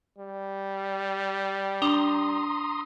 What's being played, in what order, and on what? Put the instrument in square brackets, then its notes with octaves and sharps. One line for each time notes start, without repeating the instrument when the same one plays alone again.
[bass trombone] G3
[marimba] D4 [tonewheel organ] A#5 C6 D#6